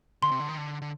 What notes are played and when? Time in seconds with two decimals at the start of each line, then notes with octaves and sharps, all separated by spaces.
0.23 D3 C6
0.31 C3
0.40 D3
0.49 D#3
0.58 D3
0.82 D3